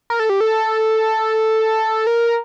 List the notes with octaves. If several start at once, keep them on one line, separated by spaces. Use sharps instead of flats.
A#4
A4
G4
A4
A#4